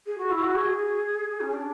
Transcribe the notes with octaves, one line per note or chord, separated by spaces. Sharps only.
G#4
F#4
E4
F#4
G#4
C#4
D4